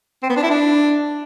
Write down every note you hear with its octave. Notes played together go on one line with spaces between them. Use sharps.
C4
B3
D4
E4
D4